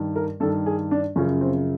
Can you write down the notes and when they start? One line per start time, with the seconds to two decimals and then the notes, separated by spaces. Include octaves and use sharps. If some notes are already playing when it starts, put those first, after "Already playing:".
Already playing: G2 D#3
0.16 A#4
0.40 G2 D#3 A4
0.66 G#4
0.91 D4
1.16 F#2 C#3 F3 C#4
1.41 C4